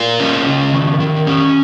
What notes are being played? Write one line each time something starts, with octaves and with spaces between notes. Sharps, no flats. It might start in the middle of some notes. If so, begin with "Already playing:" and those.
Already playing: A#3 F4
C#4
C#3
D#3
D#3
C#4